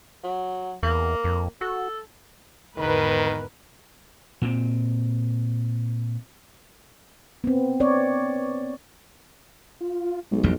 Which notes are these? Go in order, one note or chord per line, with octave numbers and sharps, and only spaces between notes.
F#3
E2 A#3
F2
F#4 A4
G#1 E2 D3 D#3 A#4 B4
A#2 C4
B3 C4
C4 C#5 D5
F4
B1 G#3
A1 F2 G3